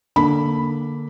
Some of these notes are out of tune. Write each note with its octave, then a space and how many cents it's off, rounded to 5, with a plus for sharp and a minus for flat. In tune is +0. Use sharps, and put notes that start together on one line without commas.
D3 +0 A#3 +0 B5 +0